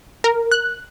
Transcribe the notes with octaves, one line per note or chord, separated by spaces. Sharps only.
A#4
F#6